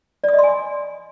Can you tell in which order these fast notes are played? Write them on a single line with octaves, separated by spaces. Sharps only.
D5 D#6 D#5 C6 G#5